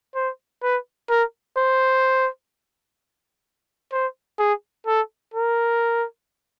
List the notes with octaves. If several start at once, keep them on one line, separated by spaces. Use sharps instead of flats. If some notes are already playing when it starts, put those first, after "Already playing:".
C5
B4
A#4
C5
C5
G#4
A4
A#4